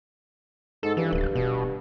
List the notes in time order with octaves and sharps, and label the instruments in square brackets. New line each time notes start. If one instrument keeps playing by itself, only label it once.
[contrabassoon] G#2 [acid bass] A4
[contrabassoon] G2 [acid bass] E3
[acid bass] D1
B2